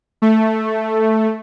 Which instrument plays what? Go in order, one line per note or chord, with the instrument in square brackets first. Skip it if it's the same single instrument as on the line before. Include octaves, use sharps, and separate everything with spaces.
[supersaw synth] A3